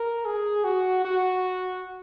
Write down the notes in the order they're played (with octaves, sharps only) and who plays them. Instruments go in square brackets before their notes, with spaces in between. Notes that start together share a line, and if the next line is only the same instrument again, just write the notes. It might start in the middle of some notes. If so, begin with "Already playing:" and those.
Already playing: [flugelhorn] A#4
G#4
F#4
F#4